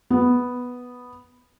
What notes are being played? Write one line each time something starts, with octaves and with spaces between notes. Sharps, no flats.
B3